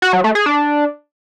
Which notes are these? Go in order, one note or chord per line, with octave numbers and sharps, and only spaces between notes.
F#4
F#3
A3
G#4
D4